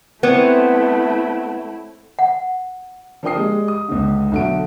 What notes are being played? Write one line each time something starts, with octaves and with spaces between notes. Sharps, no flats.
A3 B3 C4 E4 C#5 D5
F#5
F3 D4 A#4 G5 D#6 C7
G3 G#3
D#6
C#2 D3
B1 D3 A3 F#4 D7